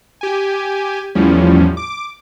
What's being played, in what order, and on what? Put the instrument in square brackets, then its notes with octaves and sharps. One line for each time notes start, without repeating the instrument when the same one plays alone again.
[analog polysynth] G4 G#5
E2 A2 F3 G3 C#4
D6